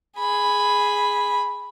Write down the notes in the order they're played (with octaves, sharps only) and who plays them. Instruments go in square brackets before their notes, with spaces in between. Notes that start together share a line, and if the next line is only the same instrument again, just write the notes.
[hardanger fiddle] G#4 B5